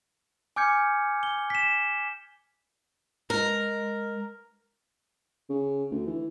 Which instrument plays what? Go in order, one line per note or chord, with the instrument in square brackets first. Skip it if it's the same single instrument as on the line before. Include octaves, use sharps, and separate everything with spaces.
[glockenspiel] G#5 D6 F6 G6 G#6 C#7
G7
B6 E7
[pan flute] G#3 [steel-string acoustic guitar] A#4
[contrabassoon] C#3
D2
E3